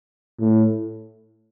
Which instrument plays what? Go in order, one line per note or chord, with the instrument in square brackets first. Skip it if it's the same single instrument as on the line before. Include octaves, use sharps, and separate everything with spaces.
[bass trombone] A2